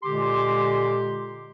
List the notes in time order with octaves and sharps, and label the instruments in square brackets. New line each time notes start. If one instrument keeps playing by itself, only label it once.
[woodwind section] A#2 D3 G#3 G4 C6 D6